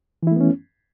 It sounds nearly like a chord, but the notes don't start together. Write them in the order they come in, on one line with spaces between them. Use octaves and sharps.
E3 E4 A3 B3 C#4